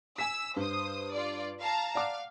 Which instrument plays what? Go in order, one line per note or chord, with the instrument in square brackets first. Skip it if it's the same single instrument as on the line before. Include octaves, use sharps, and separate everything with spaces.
[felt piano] G#5 B6 [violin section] E6
[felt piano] G2 [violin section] C5 D#6
[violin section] F4 D5
F5 A5 A#5
[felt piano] D5 F#5 D6 [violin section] F5